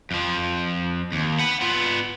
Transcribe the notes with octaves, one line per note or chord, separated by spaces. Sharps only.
F2 F3
D#2
F#5 B5
B3 F4